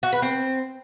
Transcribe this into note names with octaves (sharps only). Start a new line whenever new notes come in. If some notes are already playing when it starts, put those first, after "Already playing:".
F#4
B4
C4